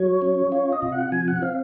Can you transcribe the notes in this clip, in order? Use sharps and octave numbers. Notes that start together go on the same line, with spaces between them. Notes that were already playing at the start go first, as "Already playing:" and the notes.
Already playing: F#3 C#5
C#4
F4 C#5
D#5
C3
F#5
F3 G#5
F#5
C4 F5